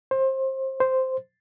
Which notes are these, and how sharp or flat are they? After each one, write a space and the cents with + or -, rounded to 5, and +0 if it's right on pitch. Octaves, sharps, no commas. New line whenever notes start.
C5 +25
C5 -5